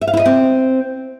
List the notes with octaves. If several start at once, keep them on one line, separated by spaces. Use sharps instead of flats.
E5
F5
E4
D#5
C4